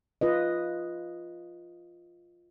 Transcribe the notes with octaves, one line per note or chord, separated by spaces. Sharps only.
F4 B4 D#5